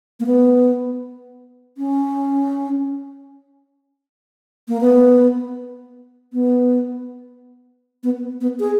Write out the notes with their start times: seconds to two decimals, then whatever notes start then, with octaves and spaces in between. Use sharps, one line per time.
0.20 A#3
0.26 B3
1.78 C#4
4.68 A#3
4.81 B3
6.33 B3
8.03 B3
8.41 B3
8.60 G#4